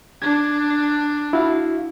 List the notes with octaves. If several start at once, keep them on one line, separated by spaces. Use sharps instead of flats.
D4 G#6
E4 F#4 F5